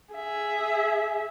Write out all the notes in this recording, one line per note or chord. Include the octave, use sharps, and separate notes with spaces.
G#4 E5